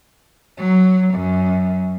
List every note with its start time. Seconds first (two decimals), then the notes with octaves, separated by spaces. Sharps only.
0.58 F#3
1.15 F#2